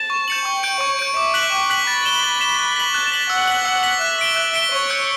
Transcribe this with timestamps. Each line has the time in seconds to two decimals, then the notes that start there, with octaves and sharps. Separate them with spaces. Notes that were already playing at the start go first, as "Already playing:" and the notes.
Already playing: A5
0.10 C#6
0.28 G6 C#7 F#7
0.45 G5 C#6
0.63 G6 D7
0.80 C#5 C#6
0.99 G6 D7
1.17 E5 D6
1.34 F#6 B6 F#7
1.52 G5 D6
1.70 F#6 B6 F#7
1.87 B5 A6
2.05 E7 G7
2.23 A6
2.41 E7 G7
2.59 F#6
2.76 B6 F#7
2.94 A5 F#6
3.12 B6 F#7
3.30 F#5 E6
3.47 B6 F#7
3.65 F#5 E6
3.83 B6 F#7
4.01 E5 F#6
4.19 B6 D7 G7
4.36 F#6
4.54 B6 D7 G7
4.72 C#5 C#6
4.90 E6 G6 C#7